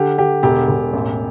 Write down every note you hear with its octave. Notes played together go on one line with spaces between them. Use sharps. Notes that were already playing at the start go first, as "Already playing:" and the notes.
Already playing: D3 G4
D3 G4
E1 G4
E1
A1